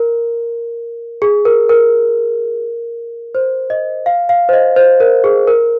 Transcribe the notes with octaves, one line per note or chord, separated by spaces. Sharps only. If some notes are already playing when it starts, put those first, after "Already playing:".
Already playing: A#4
G#4
A#4
A#4
C5
D#5
F5
F5
C5
D#5
C5
A#4
G#4
A#4